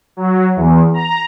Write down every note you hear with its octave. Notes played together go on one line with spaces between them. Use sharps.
F#3
E2
A#5